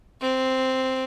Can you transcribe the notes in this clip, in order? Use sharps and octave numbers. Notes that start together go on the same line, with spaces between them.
C4